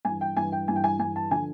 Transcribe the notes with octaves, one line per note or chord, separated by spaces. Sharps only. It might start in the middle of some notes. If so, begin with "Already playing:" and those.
G2 E3 G#5
G5
G2 E3 G#5
G5
G2 E3 G#5
G5
G#5
G2 E3 G#5
A5
D3 F3 G#5